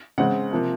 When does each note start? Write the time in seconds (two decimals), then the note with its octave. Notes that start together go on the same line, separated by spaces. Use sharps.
0.18 C#3 G#3 C4 F#5
0.51 C3 F3 A#3